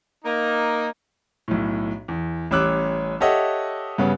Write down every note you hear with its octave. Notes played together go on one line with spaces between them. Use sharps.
A#3 D#4
B1 A2
E2
A1 G3 C#4 D6 E6 F#6
G4 A4 C#5 D#5 E5 F#5
G2 C#3 B3 C#4